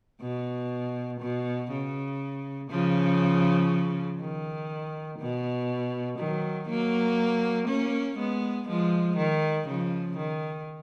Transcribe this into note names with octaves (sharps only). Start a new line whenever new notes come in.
B2
B2
C#3
C#3 F3
D#3
B2
D#3 F#3
F#3 A#3
A#3 C#4
G#3 B3
F3 G#3
D#3
C#3 F3
D#3